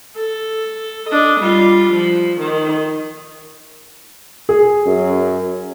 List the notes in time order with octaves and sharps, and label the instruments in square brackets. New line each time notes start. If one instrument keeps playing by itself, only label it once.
[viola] A4
D4 D#5
G3 F4
F3
D#3
[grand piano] G#4
[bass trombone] F#2